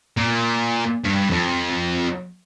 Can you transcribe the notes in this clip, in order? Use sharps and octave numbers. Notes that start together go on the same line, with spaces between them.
A#2
G2
F2